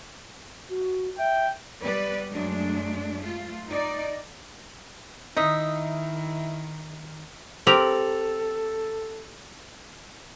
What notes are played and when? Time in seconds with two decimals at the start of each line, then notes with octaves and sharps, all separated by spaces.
0.70 F#4
1.18 E5 G5
1.81 G3 B3 B4 D5
2.29 F#2 F#3 G#3 A3 D4
3.18 A3 F4
3.68 D#4 D5
5.37 D#3 D#4 E4 D#5 E5
7.67 C4 G4 A4 A#4 F7 F#7